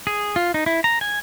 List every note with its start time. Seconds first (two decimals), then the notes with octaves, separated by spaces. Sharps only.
0.07 G#4
0.36 F4
0.54 D#4
0.66 E4
0.84 A#5
1.01 G#5